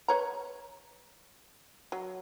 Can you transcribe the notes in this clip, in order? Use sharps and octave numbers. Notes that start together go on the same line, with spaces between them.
B4 C#5 A#5
F#3